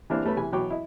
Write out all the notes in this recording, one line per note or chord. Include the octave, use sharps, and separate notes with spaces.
E3 G3 A#3 C4 D4 E4
G3 A3 B3 C#4 B5
C3 E3 G#5 B5
B2 E3 F#3 G5 C#6 D6
E4 D#5